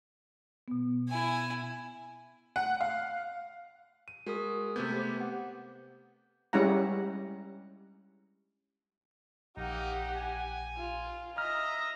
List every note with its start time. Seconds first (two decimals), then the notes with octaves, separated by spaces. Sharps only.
0.68 B2 B3
1.09 E4 G#5
2.56 F#5
2.81 F5
4.08 D#7
4.26 G#3 F#4 A#4 D#6
4.76 C3 A3 B3 D6 G6 G#6
4.92 G4 B4 C5
5.20 F#5
6.53 G3 G#3 C#4 E4 F#5 A#5
9.57 A#1 A#3 D#4 G4 F#5
10.15 G#5
10.77 F4
11.38 D#5 E5 A#5 F6